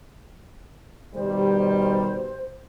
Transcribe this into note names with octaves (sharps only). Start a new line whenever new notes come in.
B2 D#3 G3 C5